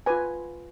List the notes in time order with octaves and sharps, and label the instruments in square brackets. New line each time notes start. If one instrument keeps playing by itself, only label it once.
[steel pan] F4 B4 G#5